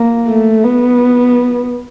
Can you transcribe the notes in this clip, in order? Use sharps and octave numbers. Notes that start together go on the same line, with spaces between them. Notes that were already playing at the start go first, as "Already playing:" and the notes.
Already playing: A#3
A3
B3